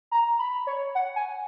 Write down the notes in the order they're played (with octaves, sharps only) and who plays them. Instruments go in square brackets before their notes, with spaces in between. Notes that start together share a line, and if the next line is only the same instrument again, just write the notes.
[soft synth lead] A#5
B5
C#5
F#5
G#5